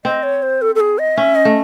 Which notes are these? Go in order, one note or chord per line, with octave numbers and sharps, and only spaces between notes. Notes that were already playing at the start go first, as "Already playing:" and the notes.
C4 D#5
C#5
C5
A4
A4
G#4
D#5
C#4 E5
D#5
A3